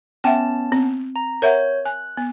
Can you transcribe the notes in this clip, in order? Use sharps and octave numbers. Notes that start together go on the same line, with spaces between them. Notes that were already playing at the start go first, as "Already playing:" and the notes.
B3 C#4 E5 F#5 G5 A5
C4
A#5
A#4 C#5 E5 F#5 G6
G#5 F#6
B3